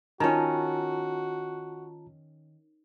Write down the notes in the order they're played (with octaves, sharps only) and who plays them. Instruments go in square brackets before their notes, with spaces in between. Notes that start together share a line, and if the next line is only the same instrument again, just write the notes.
[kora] D#3 C#4 [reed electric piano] F4 A5 A#5 [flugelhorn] F#4